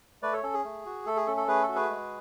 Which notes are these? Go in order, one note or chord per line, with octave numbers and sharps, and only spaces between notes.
A3 B4 D5
A4 C#5
C#4 A4
G#4
A3
F#4
A3 A4
G#4
C#4 A4
A4
A3 G#4 B4
A4
F#4
G#4 B4
G#3